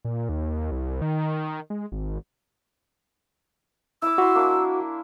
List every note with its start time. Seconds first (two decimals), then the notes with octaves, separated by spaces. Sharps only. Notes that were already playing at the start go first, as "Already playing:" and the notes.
0.05 A#2
0.29 D#2
0.72 C2
1.02 D#3
1.70 G#3
1.92 G#1
4.02 E4 D6 E6
4.18 E4 F#4 C6
4.35 A#3 D4